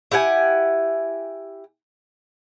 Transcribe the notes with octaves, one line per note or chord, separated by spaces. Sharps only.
E4 G4 F#5 G#5